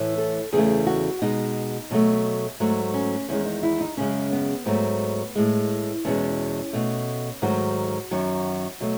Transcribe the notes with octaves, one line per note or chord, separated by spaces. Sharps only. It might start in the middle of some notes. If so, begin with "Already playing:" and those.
Already playing: A2 E3 A3
A4
E2 C#3 E3 A3 G#4
F#4
B2 G#3 D#4
B2 F#3 A3
G#2 F#3 A3
C#4
E2 D#3 G#3 C#4
D#4
E4
D#4
F#2 C#3 G#3 C#4
B3
G#2 F#3 A3 B3
A2 G#3
E2 B2 G#3 C#4
B2 A3
G#2 D#3 F#3 A3 F#4
F#2 D#3 F#3
B2 F#3 A3